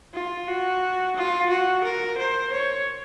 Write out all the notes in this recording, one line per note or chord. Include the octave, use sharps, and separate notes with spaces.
F4
F#4
F4
F#4
A#4
C5
C#5